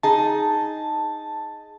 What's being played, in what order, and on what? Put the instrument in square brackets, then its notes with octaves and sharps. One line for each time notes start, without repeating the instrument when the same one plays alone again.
[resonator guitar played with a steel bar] D#4 G#4 [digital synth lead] A5